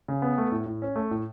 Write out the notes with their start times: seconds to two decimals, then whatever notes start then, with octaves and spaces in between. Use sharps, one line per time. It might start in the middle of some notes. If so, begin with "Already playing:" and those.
0.08 C#3
0.22 B3
0.38 A3
0.52 A2
0.66 A2
0.82 C#4
0.96 A3
1.11 A2